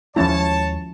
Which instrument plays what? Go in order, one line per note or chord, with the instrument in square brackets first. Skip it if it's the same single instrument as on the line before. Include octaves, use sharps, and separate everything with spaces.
[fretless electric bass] D#2 G#3 [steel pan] F3 C#4 E4 [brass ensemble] C#5 A5